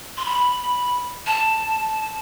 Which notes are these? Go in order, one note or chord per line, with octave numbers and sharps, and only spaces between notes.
C6
B5
A5